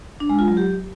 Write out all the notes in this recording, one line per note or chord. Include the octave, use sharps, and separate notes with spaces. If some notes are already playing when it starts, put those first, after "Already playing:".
D4
G#3
F4
F#3
G4